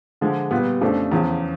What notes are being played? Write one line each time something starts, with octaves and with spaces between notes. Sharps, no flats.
D3 F3 G#3
A#2 G3 B3
F2 C#3 F3 A3 D4
E2 C#3 F3